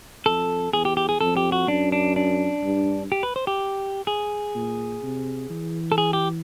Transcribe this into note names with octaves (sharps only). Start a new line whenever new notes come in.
F2 A4
E2 G#4
G4
G4
G#4
F2 A4
G4
F#4
F#2 D4
D4
D4
G2
G4
B4
C5
G4
G#4
A#2
C3
E3
A4
G#4
G4